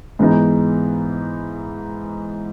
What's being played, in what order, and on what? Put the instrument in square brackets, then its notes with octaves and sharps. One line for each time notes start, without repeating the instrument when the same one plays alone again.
[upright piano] G#2 E3 G#3 B3 D#4